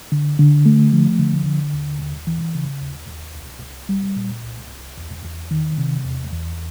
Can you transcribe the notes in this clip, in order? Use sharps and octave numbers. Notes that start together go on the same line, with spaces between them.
D3
D3
A3
F3
D3
D3
D#2
D#2
E3
C#3
D#2
D#2
C2
C2
G3
A#2
C2
C2
E2
E2
D#3
C3
E2
E2